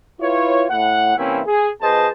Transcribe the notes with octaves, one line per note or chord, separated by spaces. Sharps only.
E4 F4 B4 C#5
A2 F#5
C3 E3 A#3 C4 C#4 E4
G#4
F2 G#4 B4 C5 D#5 A5